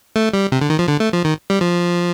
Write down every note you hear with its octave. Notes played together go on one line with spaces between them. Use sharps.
A3
G3
C3
D3
D#3
F3
D3
A3
F3
D#3
G3
F3